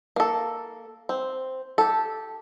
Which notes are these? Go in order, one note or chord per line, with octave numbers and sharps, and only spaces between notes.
A#3 A4
C4
G4 A4